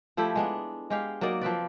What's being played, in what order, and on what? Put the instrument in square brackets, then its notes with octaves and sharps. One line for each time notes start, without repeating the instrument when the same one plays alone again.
[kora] F3 A3 E4 G4
G#3 B3 D4
G#3 G4 F5
F#3 A#3 D#4 D5
F3 C4 B4 D5